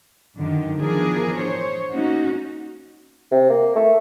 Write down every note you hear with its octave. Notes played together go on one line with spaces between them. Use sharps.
F#2 D3 D#3
E3 F3 B3 D4 G#4 A#4
C5 C#5
A#3 C#4 D#4 F#4
C3
A#3
A3